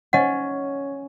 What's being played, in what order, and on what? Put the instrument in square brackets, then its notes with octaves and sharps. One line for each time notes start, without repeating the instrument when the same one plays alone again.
[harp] C#4 [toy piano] D#5 F#5